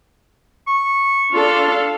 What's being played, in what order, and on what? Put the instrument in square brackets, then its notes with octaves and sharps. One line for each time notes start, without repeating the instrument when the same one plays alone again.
[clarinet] C#6
[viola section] D4 A4 F5 [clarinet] F4